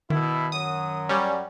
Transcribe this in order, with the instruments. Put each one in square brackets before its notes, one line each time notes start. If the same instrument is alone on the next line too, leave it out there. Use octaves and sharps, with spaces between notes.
[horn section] B2 E4 [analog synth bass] D#3
[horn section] F#2 F#3 [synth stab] D#6
[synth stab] G3 C#4